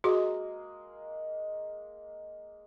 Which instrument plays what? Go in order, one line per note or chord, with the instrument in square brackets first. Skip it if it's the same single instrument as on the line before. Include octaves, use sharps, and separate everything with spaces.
[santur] G#3 A#3 [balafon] F#4 G#4